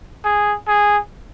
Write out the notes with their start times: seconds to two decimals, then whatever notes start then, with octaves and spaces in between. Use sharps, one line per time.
0.24 G#4
0.68 G#4